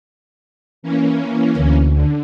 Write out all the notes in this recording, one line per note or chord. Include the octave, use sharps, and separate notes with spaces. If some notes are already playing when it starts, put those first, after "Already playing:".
E3 A#3 C#4
D2
D3